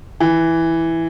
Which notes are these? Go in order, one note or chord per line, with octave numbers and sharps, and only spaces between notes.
E3